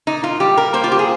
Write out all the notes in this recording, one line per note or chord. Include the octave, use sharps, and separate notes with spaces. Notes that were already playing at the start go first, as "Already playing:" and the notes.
A#2 D#4
F4
G3 G4
A#4
A#3 C5
F4
G4
G#4